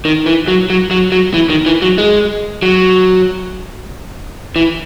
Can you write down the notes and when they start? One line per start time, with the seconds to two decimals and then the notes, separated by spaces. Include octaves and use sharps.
0.05 D#3
0.26 E3
0.48 F#3
0.70 F#3
0.91 F#3
1.12 F#3
1.34 E3
1.50 D#3
1.66 E3
1.82 F#3
1.98 G#3
2.62 F#3
4.56 E3